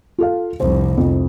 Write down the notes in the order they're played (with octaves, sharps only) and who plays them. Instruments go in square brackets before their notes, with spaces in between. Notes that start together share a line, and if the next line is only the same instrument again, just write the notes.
[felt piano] F4 A4 F5
[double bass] F1 C2 [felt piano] C5
[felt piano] F2